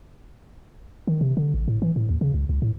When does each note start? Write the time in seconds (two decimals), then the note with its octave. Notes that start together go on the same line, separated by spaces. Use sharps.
1.07 D#3
1.21 C3
1.37 D3
1.54 A1
1.68 A2
1.82 E3
1.96 A2
2.09 D#2
2.21 C#3
2.34 C#2
2.49 C#2
2.62 A2